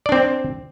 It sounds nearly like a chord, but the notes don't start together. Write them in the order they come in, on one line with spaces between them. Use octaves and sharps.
D5 D4 C4